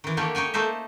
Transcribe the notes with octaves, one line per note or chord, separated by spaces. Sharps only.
D#3 E3
D3 A3 A#3 G4 C#5
D#4 C#5 G5 G#5
A3 A#3 D#4 C5 E5